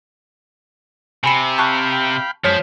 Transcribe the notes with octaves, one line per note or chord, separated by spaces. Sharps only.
C3 G#5 B5 C#7
F5 G5 A5 B5 C#6 F#6
F#2 F3 G#3 C#5 F6 B6